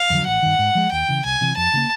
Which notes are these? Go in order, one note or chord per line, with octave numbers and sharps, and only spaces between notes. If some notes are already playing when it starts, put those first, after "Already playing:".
Already playing: F5
F2 D3 F#3
A1 F#5
G2 D#3
G#2
F3 G#3
D#2 G5
C#3 E3
C2 G#5
C3 E3
F2 A5
C#3 F3 A#3